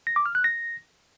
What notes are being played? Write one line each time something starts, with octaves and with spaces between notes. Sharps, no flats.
A#6
D6
F6
F#6
A#6